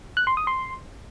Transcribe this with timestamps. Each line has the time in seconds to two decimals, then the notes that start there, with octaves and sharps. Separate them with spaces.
0.17 F#6
0.27 C6
0.37 D#6
0.47 C6